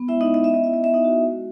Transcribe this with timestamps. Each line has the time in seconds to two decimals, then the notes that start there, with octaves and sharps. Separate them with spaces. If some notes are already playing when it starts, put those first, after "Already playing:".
Already playing: B3
0.08 G#3 E4 E5
0.21 D#4 D#5
0.28 C#4
0.34 D#5
0.44 B3 E5
0.54 D#5
0.64 E4 E5
0.74 D#5
0.84 B3 E5
0.94 D#4 D#5
1.04 F#4
1.24 G#3